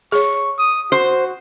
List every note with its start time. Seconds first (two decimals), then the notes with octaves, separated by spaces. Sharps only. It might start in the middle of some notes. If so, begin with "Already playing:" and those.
0.12 G#4 C#5 C#6
0.58 D#6
0.92 F#4 C5